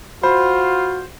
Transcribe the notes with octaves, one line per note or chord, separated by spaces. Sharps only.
F4 F#4 C5 B5